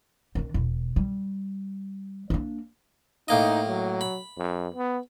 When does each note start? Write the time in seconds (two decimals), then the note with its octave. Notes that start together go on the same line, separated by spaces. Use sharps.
0.35 D#3 D4
0.54 E1
0.96 G3
2.30 A#3 D4
3.28 A2 A#3 D#4 D#5
3.67 F#3
4.01 B5
4.38 F2
4.75 B3